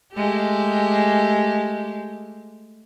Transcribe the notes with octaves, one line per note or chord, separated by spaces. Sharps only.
G#3 A3 G4